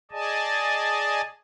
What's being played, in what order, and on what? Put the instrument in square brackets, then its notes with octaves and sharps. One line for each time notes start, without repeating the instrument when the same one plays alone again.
[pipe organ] G#4 D5 D#5 G#5 A5